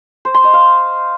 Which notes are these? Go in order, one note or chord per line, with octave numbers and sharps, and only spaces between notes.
C5
C6
D#5
F5